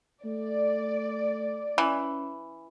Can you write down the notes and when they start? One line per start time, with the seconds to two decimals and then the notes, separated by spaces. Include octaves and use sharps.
0.25 A3 D5
1.78 E3 C#4